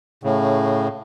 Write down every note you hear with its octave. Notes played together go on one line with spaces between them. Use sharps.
A2 C#3